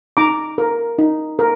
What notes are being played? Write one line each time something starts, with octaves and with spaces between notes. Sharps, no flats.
D#4 A#5 D6
A#4
D#4
A#4